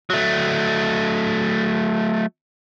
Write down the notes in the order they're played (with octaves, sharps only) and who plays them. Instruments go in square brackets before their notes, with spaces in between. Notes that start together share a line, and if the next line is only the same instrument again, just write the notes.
[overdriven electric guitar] F#3 A3